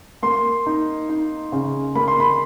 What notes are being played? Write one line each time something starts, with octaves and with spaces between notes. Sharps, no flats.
A#3 C6
D#4
D#4
C#3
A#3 B5
C6
B5